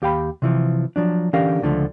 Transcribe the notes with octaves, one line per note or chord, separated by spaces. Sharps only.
D#2 G4 F5 G5 B5
C3 E3 F3
F3 F#3 D4
D3 E3 C#4 G4 A#4 F5
C#2 D3 F3 A3